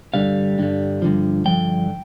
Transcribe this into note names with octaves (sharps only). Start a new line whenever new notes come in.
G2 D3 G3 F5
G2 D3 G3
G2 D3 F3
G2 D3 F3 G5